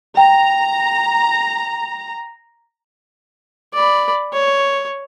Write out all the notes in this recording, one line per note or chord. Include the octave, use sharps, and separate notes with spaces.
G5 A#5
D5 B5
C#5